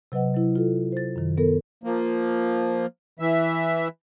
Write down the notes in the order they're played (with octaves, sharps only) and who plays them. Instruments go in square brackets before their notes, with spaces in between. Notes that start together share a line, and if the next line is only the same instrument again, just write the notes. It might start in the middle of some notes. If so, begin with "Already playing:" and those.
[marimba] C3 F#3 B4 D#5 F#5
F#3 E4
F4 A4
C5 A6
F#2 D#3
B3 A4 A#4
[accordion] F3 A#3
E3 E5